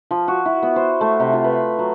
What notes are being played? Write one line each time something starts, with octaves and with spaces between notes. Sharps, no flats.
F3
F#4
E4
B3
C5
A3
C3
F4
B4
F#3